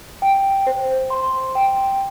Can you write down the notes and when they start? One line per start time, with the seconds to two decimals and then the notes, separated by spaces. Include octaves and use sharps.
0.22 G5
0.67 C5
1.10 C6
1.55 G5